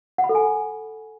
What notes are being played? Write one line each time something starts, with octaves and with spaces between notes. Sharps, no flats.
F#5
B5
A4
G#5